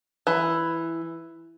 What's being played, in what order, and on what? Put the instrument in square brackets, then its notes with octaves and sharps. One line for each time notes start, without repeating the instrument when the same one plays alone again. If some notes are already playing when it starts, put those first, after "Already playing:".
[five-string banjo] E3